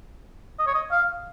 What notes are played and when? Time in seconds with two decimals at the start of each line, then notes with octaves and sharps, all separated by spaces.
0.59 D#5
0.67 C#5
0.75 D#5
0.92 F5